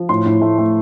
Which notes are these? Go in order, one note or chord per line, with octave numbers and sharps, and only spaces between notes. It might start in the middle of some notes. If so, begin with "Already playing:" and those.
Already playing: F3
A2 C6
A2
A3
A3